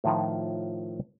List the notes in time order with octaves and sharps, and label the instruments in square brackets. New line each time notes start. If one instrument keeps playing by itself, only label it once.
[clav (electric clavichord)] A2 D#3 F3 F4